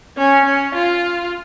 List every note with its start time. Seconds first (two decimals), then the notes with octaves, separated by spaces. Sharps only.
0.18 C#4
0.45 C#4
0.75 F4